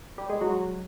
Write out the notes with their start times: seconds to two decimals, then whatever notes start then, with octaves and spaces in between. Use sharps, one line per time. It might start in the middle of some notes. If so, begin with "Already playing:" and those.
0.18 G3
0.30 G#3
0.41 F#3